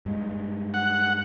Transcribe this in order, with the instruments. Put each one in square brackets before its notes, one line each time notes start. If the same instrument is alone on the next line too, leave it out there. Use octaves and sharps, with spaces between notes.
[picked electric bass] G2 G#3
[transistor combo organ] F#5